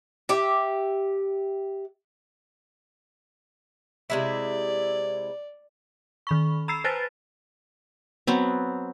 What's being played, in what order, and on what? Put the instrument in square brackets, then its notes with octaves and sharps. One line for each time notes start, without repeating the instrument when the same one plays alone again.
[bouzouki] G4 E5
[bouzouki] C3 G#3 E4 [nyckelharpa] D5
[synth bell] D#3 B5 C#6
A#5 B5 E6 C7
B4 C5 G#5 A5 A6
[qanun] F#3 B3 C4